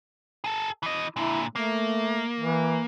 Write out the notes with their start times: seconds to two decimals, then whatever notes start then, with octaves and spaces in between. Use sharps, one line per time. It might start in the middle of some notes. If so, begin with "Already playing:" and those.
0.44 G#4 A4
0.83 E3 D#5
1.16 A#2 D3 E4
1.55 A3 A#3
2.40 E3